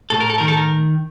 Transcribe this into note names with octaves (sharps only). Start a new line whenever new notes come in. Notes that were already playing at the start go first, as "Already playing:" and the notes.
A2 A4
A#4
A4
D#3 A#4
A4
A#4